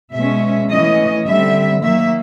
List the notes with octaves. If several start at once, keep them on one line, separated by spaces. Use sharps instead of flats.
B2 G#3 C#4 E5
E3 A3 C#4 D#5
D3 G3 C4 E5
D#3 F#3 A#3 E5